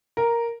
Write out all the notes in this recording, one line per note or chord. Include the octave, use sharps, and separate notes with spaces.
A#4